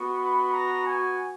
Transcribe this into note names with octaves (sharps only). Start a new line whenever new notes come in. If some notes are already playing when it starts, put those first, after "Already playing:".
Already playing: B3 F#4
B5
A#5
G#5